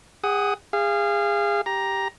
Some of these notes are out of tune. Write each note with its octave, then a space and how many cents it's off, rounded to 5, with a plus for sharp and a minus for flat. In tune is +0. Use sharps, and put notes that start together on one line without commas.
G#4 -35 F#5 +15 D#6 +10
G#4 -30 F5 -20
G4 +0 A#5 +10